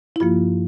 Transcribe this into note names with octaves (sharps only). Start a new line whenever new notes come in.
E4
G2 F3 A#3 F4